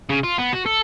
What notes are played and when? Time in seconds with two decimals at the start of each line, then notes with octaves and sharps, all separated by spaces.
0.10 C#3
0.24 F4
0.38 B3
0.53 F#4
0.66 A4